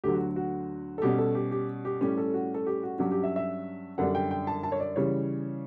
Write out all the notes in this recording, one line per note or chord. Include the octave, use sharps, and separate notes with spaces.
D2 D3 F#3 G4
F#4
F#4
A4
B2 G3 C#4 G4
A4
G4
G4
G4
A2 G3 C#4 G4
A4
F#4
A4
G4
F#4
G2 F#3 C#4 G4
G4
E5
E5
F#2 D3 G3 D4 F#5
G5
G5
A5
A5
C#5
D5
C#3 E3 G3 C#5